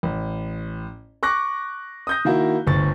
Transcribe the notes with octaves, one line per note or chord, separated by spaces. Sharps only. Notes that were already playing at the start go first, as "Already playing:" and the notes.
A1
C#6 D6 F#6 A#6
D#6 G6 A#6
D#3 A#3 E4 F#4
G1 D2 C#6 A6